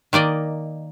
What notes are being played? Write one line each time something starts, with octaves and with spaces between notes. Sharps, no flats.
D#3 A#3 D5 D#5